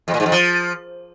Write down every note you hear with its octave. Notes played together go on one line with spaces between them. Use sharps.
F2
A#2
G#2
F2
F3